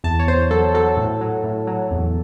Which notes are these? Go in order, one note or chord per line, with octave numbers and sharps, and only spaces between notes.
E2 A5
C#5
E2 C5
F#3 A4
F#3 A4
A2
F#3
A2
F#3
E2